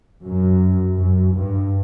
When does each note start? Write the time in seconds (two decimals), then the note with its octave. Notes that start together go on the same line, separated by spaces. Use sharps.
0.25 F#2
0.97 F#2
1.34 G2